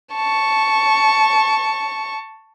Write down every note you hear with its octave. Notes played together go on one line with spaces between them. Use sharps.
A5 C#6